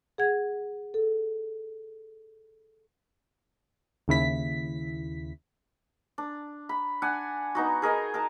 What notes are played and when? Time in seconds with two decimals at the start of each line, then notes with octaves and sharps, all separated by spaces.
0.18 G#4 F#5 G#6
0.94 A4
4.08 D#2 C#3 E4 B6
6.18 D4
6.69 B5
7.02 D4 F#5 G#5
7.55 B3 D#4 F#4
7.82 G#4 A#4 D#5 G#5
8.14 A#4 A5